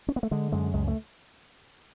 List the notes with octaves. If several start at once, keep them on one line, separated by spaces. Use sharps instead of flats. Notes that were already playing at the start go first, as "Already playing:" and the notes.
C#4
B3
A3
D3 G#3
F#2 G#3
C#2 G#3
A3